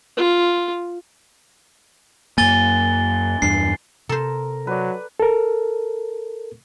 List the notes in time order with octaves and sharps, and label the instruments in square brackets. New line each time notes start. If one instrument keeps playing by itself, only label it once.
[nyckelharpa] F4
[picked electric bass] F#2 A#3 [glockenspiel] G#5 A6 G7
[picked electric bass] E2 G2 D4 [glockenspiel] C7
[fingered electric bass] C3 [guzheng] A4 C5 [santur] A#4
[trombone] F#3 [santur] B4 D5
[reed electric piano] A4 A#4